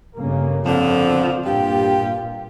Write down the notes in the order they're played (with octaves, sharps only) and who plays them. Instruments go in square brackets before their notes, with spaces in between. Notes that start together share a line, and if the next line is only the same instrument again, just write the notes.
[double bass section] G1 C#3 A#3
[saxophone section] F2 D3 F3
[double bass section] B2
[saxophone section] G2 F4 G4 [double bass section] A#2